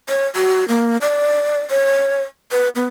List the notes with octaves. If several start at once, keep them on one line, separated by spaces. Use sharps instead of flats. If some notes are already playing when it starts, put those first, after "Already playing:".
C#5
F#4
A#3
D5
C#5
B4
B3